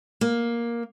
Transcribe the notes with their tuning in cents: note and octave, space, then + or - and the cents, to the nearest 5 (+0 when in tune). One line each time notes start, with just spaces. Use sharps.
A#3 +10